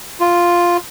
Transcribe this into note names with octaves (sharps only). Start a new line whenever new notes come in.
F4